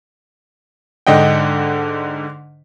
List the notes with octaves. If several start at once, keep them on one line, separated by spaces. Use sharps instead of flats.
G#2 D3 D4 D#5 F#5 G5